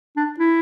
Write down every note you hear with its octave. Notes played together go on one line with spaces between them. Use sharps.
D4
E4